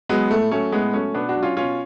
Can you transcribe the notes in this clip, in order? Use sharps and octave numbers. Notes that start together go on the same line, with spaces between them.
F#3 G#3 B3
A2 A3
F#3 A3 C#4
A2 G#3 B3
F#3 A3 C#4
B2 B3 D4
D4 F#4
F#3
C#4 F4
B2 C#4 F4